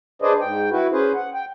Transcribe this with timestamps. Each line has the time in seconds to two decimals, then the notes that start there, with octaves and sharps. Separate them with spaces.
0.22 D4 G#4 B4 C5 D5 D#5
0.41 G#2 G5
0.71 E4 F#4 B4
0.92 C#4 G#4 B4 C5
1.15 F#5
1.34 G5